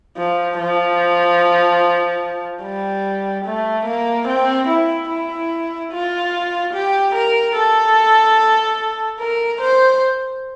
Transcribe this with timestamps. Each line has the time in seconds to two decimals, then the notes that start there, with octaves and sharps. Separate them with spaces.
0.17 F3
0.58 F3
2.63 G3
3.45 A3
3.86 A#3
4.27 C4
4.68 E4
5.09 E4
5.92 F4
6.73 G4
7.15 A#4
7.56 A4
9.20 A#4
9.61 C5